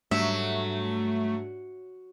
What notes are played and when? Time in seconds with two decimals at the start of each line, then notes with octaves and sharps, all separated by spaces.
0.11 G#2 F#3 G3 A3 D4 E5